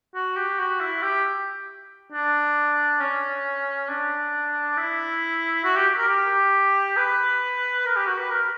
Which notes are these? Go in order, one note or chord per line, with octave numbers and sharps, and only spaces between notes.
F#4
G4
F#4
E4
G4
D4
C#4
D4
E4
F#4
G4
A#4
G4
B4
A#4
G4
F#4
B4
A#4